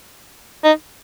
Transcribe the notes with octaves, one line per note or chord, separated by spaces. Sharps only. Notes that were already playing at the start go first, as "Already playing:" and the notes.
D#4